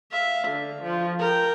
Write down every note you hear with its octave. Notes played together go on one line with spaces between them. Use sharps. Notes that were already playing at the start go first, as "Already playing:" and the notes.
E5 F5
D3
F3
A#4 G5